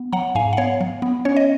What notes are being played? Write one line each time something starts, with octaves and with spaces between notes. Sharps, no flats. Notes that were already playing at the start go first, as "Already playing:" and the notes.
Already playing: B3
F#3 F#5 A#5
G#2 F5 G#5
F#5
B3 C#5 F5
F#3
B3
C#4 C#5
D#5